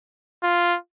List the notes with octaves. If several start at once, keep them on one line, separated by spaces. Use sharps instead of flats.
F4